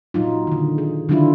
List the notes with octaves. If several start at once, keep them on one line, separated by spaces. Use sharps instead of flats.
A#2 F#3 D#4 F4
D3 D#3
G#4
D3 D#3 F#3 D4 E4 F4